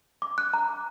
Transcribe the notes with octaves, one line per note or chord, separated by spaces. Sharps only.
D6
F#6
A#5
D6